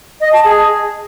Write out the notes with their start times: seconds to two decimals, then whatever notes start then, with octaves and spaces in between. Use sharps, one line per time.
0.21 D#5
0.33 A5
0.45 G#4